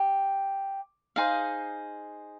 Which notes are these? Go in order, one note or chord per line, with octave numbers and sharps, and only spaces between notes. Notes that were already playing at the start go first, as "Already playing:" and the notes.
Already playing: G4
D#4 G#4 C5 F5